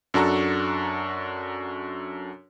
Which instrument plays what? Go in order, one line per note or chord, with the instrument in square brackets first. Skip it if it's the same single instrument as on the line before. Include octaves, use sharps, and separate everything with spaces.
[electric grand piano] F#2 D4 F#4 A4 A#5 C#6